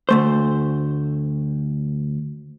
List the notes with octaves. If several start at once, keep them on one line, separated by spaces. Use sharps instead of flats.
D2 A3 C5